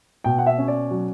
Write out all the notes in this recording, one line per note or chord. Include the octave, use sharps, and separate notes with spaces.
B2 G5
F#5
E5
C#4
D5
F#3